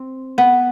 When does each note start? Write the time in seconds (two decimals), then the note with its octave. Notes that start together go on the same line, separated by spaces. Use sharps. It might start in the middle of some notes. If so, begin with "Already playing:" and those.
Already playing: C4
0.38 B3